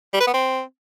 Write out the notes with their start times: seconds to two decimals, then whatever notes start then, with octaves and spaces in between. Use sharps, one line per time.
0.13 G3
0.20 B4
0.27 B3
0.34 C4